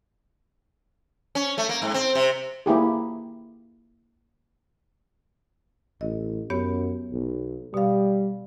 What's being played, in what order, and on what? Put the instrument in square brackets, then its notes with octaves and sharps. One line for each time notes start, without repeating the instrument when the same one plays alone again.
[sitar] C#4
A3
A#3
G#2
C4
C3
[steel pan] A#3 E4 G4 G#4
[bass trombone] A1 [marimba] D#5
[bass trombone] F#2 [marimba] B3 G4 C#5
[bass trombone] B1
[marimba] B2 F5 [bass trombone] G3